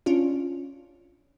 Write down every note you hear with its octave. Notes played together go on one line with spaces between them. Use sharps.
C#4 D4 F4